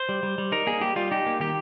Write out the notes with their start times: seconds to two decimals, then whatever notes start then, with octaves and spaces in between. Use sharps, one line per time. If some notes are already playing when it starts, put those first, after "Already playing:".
Already playing: C5
0.09 G3
0.23 G3
0.38 G3
0.52 D#4 A#4
0.67 A#3 G#4
0.81 G3 G4
0.96 G3 F4
1.11 D#4 G4
1.26 A#3
1.40 D#3 G4